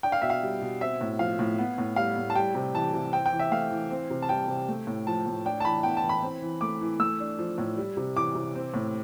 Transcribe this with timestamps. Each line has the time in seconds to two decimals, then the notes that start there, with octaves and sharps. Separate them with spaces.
0.03 D4 G5
0.12 F5
0.22 B2 E5
0.30 F5
0.43 G3
0.61 B2
0.81 C4 E5
1.01 A2
1.19 F3 F5
1.39 A2
1.59 B3
1.78 A2
1.96 G3 F5
2.17 A2
2.30 A5
2.36 G3 G5
2.55 C3
2.75 E3 A5
2.93 C3
3.13 C4 G5
3.26 G5
3.32 E3
3.39 E5
3.51 A3 F5
3.71 E3
3.91 C4
4.10 C3
4.22 A5
4.29 G3 G5
4.48 C3
4.69 A3
4.87 A2
5.07 F3 A5
5.26 A2
5.45 D4 G5
5.60 A5
5.65 E3 B5
5.83 B3 G5
5.97 A5
6.03 E3
6.09 B5
6.22 C4
6.42 E3
6.61 A3 D6
6.81 E3
7.00 A3 E6
7.20 D4
7.39 F3
7.58 A2
7.77 G3
7.97 C3
8.16 E3 D6
8.35 C3
8.55 C4
8.74 A2